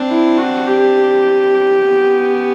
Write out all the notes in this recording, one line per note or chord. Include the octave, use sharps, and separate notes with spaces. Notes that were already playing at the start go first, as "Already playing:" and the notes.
Already playing: C4 D4
E4
F#4
G4
B3 C#4